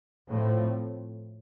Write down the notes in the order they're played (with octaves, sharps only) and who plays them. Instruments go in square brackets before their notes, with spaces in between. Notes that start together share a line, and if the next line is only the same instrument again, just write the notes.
[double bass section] A2 F3 A3 C4